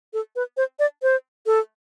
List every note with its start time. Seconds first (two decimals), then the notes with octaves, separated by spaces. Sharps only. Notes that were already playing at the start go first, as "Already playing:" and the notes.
0.13 A4
0.36 B4
0.57 C5
0.79 D5
1.03 C5
1.46 A4